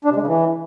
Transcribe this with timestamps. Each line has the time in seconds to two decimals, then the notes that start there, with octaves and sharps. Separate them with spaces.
0.05 D4
0.10 C3
0.16 G#3
0.21 C#3
0.27 E3